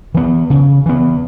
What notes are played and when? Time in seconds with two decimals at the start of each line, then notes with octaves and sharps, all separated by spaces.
0.14 E3 B3
0.50 C#3
0.86 E3 B3